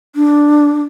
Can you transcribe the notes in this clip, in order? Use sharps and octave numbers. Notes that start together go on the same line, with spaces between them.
D4